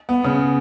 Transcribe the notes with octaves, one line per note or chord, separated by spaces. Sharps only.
B3
C#3